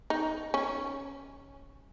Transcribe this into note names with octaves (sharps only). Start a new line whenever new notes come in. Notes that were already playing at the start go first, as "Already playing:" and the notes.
D#4
C#4